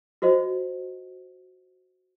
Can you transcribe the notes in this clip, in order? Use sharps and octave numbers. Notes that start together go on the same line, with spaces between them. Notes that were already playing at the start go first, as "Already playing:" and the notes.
F4 F#4 C5 D#5